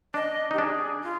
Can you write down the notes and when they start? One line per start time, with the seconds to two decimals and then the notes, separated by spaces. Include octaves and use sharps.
0.14 D4 D#5
0.51 D#4 G4
0.58 D4 G#4
1.03 F4